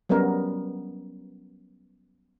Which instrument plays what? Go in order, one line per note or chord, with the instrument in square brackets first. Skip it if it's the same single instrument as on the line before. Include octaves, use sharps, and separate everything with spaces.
[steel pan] F#3 G3 B3 C#4 A#4